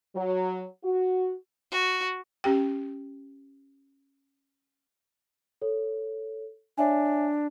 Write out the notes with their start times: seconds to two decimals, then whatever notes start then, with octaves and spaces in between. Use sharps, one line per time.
0.15 F#3
0.84 F#4
1.71 F#4
2.44 C#4 G4 G5
5.62 A4 C#5
6.78 D4 C#5 E5 G#5